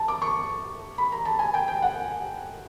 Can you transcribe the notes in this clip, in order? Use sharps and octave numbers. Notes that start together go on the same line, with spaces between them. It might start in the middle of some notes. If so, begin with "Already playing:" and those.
Already playing: A5
D6
C#6
B5
A#5
A5
G#5
G5
G5
F#5